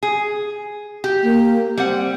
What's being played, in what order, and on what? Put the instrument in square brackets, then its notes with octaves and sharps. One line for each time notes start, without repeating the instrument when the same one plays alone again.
[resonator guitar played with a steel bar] G#4
G4
[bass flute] A#3
[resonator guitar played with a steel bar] G3 F#5 [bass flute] C4